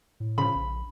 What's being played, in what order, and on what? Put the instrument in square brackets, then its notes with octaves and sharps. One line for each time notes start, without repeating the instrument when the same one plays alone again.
[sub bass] A2
[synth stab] C#3 F3 [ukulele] B5
[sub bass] A#1